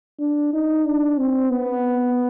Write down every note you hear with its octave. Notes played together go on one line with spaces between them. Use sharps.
D4
D#4
D4
C4
B3